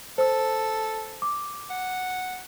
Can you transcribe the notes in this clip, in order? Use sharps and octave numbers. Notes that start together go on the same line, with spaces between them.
A4 C5 E6
D6
F#5